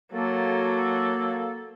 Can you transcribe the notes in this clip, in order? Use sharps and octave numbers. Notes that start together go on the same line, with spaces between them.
F#3 A#3 A4